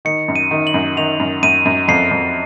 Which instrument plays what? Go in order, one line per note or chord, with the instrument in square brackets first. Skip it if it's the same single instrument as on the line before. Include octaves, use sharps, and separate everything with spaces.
[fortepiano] D#3 [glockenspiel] C#7
[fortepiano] F#2
[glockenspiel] D#7
[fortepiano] D#3
[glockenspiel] F#7
[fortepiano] F#2
[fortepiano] D#3 [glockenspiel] F7
[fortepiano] F#2
[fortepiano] F#2 [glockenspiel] D#7
[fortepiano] F#2
[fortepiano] F2 [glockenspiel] C7
[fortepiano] F2